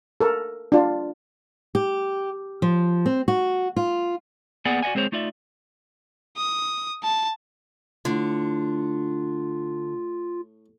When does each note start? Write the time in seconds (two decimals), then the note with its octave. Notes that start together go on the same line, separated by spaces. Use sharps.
0.21 A4 A#4
0.72 D4 F4
1.75 G4
2.62 F3
3.06 C4
3.28 F#4
3.76 F4
4.65 A#3 B3 G#4 D5 F#5 G#5
4.82 F#4 D5 D#5 F#5 G#5
4.95 G#3 C4 G#4 C5 C#5
5.12 A3 D#4 F4 D5 E5
6.37 D#6
7.03 A5
8.05 A2 D3 F4